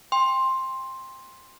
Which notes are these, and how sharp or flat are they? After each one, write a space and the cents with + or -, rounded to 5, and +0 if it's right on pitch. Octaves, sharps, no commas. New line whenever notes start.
G5 +30 C6 +10